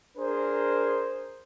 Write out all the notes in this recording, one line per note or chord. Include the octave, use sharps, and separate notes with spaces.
D4 G#4 A#4 C5